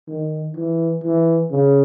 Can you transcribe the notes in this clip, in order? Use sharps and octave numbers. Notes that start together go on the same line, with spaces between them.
D#3
E3
E3
C#3